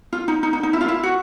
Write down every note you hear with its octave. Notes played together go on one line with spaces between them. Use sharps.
F4
D#4
D#4
D#4
D#4
E4
F4
E4
F#4